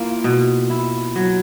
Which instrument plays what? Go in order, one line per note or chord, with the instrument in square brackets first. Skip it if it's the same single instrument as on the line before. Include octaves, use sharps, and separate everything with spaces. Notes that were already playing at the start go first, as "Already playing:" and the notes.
Already playing: [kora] A#3 [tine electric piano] E4 F4
[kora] B2
E4
F#3